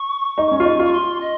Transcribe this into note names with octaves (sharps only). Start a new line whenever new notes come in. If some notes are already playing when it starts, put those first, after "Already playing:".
Already playing: C#6
D#4
C#4
F4
D#4
F4 C#6
C6
D#5